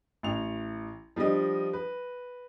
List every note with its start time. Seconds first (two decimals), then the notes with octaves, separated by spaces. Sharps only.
0.23 A1 F7
1.16 F3 G3 D4 D#5
1.73 B4